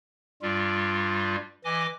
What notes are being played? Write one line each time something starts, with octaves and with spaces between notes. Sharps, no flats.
G2 G3 F4
E3 D#5 G#5 D6